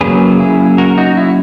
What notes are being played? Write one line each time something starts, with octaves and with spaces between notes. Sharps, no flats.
C#3 F#3 A#3 C#4 G#4 B4
E4 G#4
F#4 A#4
D#4 F#4
E4